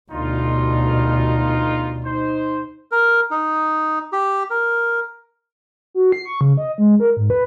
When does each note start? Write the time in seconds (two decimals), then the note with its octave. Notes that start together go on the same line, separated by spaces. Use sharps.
0.12 G1 D2 B2 D#4 F4
2.05 D#4 C5
2.92 A#4
3.31 D#4
4.13 G4
4.50 A#4
5.94 F#4
6.12 C7
6.25 C#6
6.41 C#3
6.57 D#5
6.78 G#3
7.00 A#4
7.17 G#2
7.30 B4